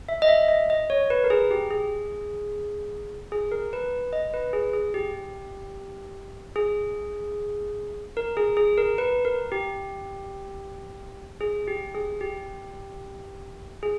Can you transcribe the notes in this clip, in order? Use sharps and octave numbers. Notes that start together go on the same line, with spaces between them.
E5
D#5
E5
D#5
D#5
C#5
B4
A#4
G#4
G4
G#4
G#4
A#4
B4
D#5
B4
G#4
G#4
G4
G#4
A#4
G#4
G#4
A#4
B4
A#4
G4
G#4
G4
G#4
G4
G#4